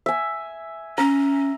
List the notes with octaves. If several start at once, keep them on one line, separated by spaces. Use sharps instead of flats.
E5 G#5
C#4 A#5